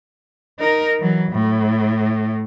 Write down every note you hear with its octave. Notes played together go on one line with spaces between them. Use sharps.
D#4 A#4
E3 F#3
A2